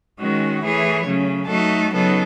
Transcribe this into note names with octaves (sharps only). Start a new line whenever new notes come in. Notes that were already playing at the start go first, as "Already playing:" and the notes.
D#3 G#3 C#4 F#4
E3 A3 E4 G#4 C#5
C#3 F#3 A3 C#4
F#3 A3 D#4 F#4 A4
C#3 F#3 B3 D#4 A4